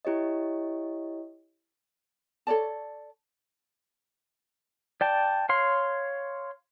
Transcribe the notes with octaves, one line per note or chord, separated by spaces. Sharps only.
E4 G4 C#5 D#5
A4 C#5 D5 A5
D5 G5 A5
C#5 F5 C6